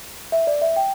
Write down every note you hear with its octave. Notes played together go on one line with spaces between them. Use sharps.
E5
D5
E5
G5